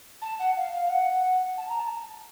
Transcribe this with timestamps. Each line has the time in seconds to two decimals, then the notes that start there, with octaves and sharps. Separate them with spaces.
0.22 A5
0.39 F#5
0.57 F5
0.73 F5
0.86 F5
0.90 F#5
1.58 A5
1.69 A#5
1.79 A5